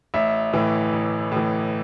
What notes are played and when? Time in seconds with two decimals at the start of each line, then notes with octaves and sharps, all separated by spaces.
0.14 A1 E5
0.53 A2 E3
0.93 A1
1.32 A2 E3